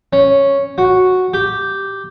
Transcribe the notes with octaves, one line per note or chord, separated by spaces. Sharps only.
C#4
F#4
G4